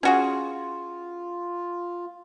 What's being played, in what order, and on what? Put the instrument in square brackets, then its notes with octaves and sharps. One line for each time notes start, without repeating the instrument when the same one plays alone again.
[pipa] C#4 F#4 G#4 [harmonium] F4